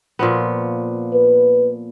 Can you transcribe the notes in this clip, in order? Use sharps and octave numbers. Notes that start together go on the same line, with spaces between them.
A#2 F3 B3
B4